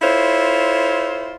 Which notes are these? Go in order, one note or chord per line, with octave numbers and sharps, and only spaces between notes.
E4 F4 A4 C5 C#5